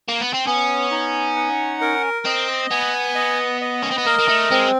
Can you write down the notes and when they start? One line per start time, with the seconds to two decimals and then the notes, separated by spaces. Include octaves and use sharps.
0.08 A#3
0.20 B3
0.33 C4
0.46 B3 C#4
0.91 D#4
1.36 F#5
1.81 A#4
2.25 C4 D#5
2.71 B3 G#5
3.15 D#5
3.61 D#5
3.82 C#4
3.91 C4
3.98 B3
4.06 A#3 A#4
4.19 A#3
4.28 A3
4.51 G#3 C4